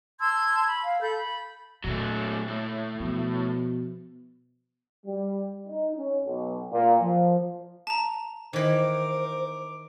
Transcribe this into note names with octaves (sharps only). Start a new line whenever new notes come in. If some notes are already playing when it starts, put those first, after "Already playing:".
A5 C6 E6 G#6
B5
F5
A4 B5 G6
B5
A#2 D3 F#3 A3
A2
B2 F3
G3
D#4
C#4
B1
A#2
F3
A5 A#5
D#3 E3 A#4 C5 D6